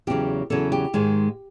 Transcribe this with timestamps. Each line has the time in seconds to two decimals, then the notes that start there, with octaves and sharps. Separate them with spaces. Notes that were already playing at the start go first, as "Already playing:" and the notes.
0.07 E2 C#3 F#3 G4
0.50 E2 C#3 F#3 A4
0.72 G4
0.94 G#2 D#3 G#3